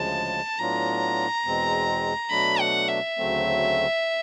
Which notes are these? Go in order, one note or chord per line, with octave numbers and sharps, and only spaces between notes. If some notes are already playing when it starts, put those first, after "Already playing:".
Already playing: D2 C#3 F3 G#3 A5
A2 F#3 B3 D4 F4 A#5
E2 B2 G#3 C4
B2 F#3 A3 D4 B5
F#5
E5
D2 C#3 F#3 A3 C4